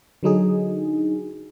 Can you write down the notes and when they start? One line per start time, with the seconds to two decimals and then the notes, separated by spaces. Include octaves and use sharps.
0.23 D3 F#3 D#4 G#4